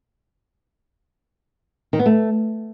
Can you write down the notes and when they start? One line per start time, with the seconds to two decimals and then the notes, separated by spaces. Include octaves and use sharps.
1.93 D#3
1.99 B3
2.06 A3